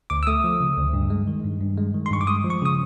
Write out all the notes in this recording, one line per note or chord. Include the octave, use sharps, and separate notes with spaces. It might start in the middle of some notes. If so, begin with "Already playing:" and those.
D2 D6
E6
A3 D#6
F3
C#3
D2
G2
G#3
D#3
G2
G2
G#3
D#3
C6
G2 C#6
D6
G#3 D#6
F3
C#6
C#3 D#6